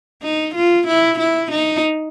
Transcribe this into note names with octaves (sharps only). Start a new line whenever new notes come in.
D#4
F4
E4
E4
D#4